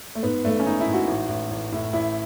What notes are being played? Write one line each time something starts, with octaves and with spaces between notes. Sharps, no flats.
A3
G#2 B3
G#1 A3
C#4
D#3 D#4
E4
G#2
F#4
A1
A1
A1
A2
A1 E4